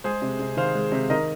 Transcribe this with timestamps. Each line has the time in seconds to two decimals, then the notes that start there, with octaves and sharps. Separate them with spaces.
0.04 G#3 G#4 C5
0.22 C3
0.40 C3
0.57 D#3 C5 F5
0.75 G#3
0.92 C3
1.10 D#3 A#4 D#5